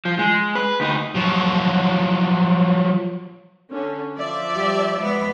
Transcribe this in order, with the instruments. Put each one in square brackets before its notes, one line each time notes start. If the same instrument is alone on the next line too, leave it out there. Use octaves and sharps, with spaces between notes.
[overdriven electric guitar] F3
G#3
B4
D2 D#4
[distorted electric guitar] F3 F#3
[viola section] D3 C#4
F3 D5 E5
[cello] G3 G4
G#3 B3